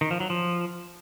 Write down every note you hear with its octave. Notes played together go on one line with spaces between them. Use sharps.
D#3
F3
F#3
F3